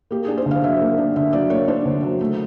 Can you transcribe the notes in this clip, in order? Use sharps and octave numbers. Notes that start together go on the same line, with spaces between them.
A#3 G4
D4 G#4
C5
D3 F5
F#3 E5
A#3
D4
D3 E5
F#3 D5
A#3 C#5
D4 C5
D3
F#3
A3